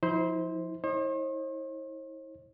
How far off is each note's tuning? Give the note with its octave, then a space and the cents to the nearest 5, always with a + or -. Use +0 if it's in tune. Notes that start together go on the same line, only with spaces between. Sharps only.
F3 +15 E4 -40 C5 -5
E4 -40 C5 +45 D#5 -20